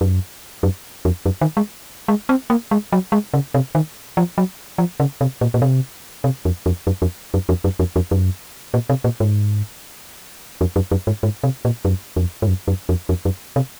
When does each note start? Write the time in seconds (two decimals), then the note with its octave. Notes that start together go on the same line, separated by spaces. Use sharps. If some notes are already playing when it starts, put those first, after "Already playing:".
0.01 F#2
0.63 F#2
1.05 F2
1.26 F#2
1.41 D#3
1.57 G#3
2.08 G#3
2.29 C4
2.50 A#3
2.71 G#3
2.92 F#3
3.12 G#3
3.34 C#3
3.54 C3
3.75 D#3
4.17 F3
4.38 F#3
4.78 F3
5.00 C#3
5.21 C3
5.41 A#2
5.54 A#2
5.62 C3
6.24 C3
6.45 F2
6.66 F2
6.87 F#2
7.02 F2
7.34 F#2
7.49 F2
7.64 F#2
7.79 F2
7.96 F2
8.11 F#2
8.74 A#2
8.89 C3
9.04 A#2
9.20 G#2
10.61 F2
10.76 F#2
10.91 F#2
11.07 G#2
11.23 G#2
11.43 C3
11.65 A#2
11.85 F#2
12.16 F2
12.42 G#2
12.48 F#2
12.68 F#2
12.89 F2
13.09 F2
13.25 F#2
13.56 C3